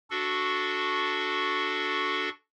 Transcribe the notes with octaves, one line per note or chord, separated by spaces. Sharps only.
D4 F#4 A4 C#6